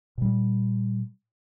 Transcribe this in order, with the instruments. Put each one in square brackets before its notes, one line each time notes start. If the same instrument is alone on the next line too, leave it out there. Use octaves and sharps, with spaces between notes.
[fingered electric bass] A#2 G3